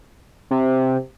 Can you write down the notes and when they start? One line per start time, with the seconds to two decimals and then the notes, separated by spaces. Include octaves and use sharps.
0.51 C3